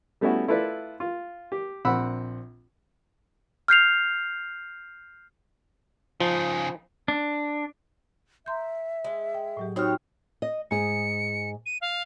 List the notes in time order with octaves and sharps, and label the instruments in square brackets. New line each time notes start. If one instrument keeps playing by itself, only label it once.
[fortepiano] G3 A3 B3 C#4 E4 F#4
A3 E4 F4 A4 B4 D5
F4
G4
A#1 C4 F#5 B5 E6
[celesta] F6 G6 C7 F7
[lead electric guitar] C#3 D#4 [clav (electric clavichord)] F3
[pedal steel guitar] D4
[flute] E5 [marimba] A#5 C6 G6
[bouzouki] G#3
[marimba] G5
A2 F#3 G4
[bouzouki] C4 C#5 [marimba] D#4 D#6 F#6 [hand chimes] F#4 G4 F6
[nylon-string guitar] D#5
[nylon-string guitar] G#2 G#4 [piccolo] C#7
[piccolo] D#7
F5